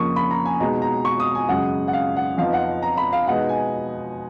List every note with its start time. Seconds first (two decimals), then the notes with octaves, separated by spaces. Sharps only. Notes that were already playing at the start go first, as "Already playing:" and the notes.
Already playing: F2 C#3 F3 A#3 C#6 D#6
0.16 B5
0.31 A#5
0.45 G#5
0.60 B2 G#3 B3 D#4 A#5
0.82 A#5
1.05 C#6
1.20 D#6
1.35 G#5
1.49 F#2 C#3 G#3 F#5
1.88 F#5
1.93 F5
2.16 F#5
2.38 F2 F3 B3 D#4 F5
2.53 F#5
2.82 A#5
2.97 B5
3.13 F5
3.27 B2 G#3 B3 D#4 F#5
3.49 G#5